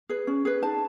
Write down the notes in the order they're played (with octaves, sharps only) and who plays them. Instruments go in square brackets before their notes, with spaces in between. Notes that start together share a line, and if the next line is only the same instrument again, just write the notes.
[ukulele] G#4 B4
C#4
G#4 B4
D#4 A5